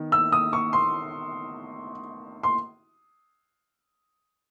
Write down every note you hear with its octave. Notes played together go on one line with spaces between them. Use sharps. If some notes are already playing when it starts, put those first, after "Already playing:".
Already playing: D#3 B3
E6
D#6
C#6
C6
C6